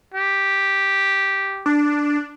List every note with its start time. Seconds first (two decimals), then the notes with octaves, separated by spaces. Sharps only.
0.14 G4
1.66 D4